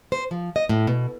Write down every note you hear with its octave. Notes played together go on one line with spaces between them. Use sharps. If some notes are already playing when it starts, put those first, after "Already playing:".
C5
F3
D#5
A2
B2